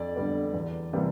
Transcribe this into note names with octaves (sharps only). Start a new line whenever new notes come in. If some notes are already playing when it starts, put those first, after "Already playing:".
Already playing: F2 D5
D3 G3 B3
E2
C3 E3 G3 A#3